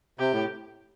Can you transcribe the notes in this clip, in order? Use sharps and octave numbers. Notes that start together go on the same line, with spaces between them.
C3 G4
A2